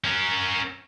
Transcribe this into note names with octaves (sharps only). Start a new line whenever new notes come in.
C#4 A#4